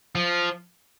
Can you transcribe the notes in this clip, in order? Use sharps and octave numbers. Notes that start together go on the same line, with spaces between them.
F3